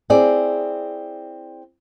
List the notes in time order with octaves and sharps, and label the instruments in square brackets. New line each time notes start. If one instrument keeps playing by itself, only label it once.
[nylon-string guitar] C4 E4 G#4 D5